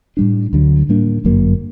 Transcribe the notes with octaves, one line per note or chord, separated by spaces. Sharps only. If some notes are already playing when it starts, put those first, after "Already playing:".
A2 G3 D4
D2 D3 F#3
A2 G3 A#3 D4
G1 F#2 F#3 A#3